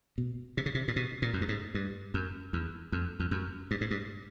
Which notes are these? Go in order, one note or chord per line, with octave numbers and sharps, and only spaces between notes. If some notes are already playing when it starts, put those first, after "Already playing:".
B2
C3
C#3
C3
A#2
B2
A#2
F#2
G2
G#2
G2
F#2
E2
F2
F2
F#2
G2
G#2
G2